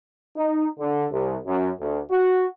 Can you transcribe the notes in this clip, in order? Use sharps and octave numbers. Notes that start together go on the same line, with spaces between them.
D#4
D3
C2
F#2
D2
F#4